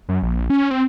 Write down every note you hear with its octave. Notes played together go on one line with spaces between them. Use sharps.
F#2
A#1
C#4
C4